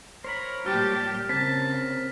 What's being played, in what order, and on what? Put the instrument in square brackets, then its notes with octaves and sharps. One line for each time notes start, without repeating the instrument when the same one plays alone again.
[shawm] A#4 [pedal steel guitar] C5 C#5 B5
[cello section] A#2 G3 G4 [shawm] A5 [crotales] F6
[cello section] C#3 [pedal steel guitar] C4 A#4 [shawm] A5 [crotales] B6